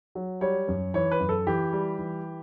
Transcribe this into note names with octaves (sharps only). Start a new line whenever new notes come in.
F#3
G3 C#5
F#2
E3 C#5
B4
F#2
A4
E3 G4
G3
E3